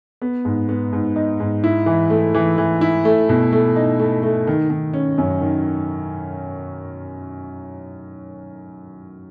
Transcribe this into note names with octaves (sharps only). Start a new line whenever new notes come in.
B3
G#2
B3
G#2
D#4
G#2
E4
E3
A3
E3
E3
E4
A3
B2
A3
D#4
A3
A3
D#3
D#3
C#4
F#2
D#3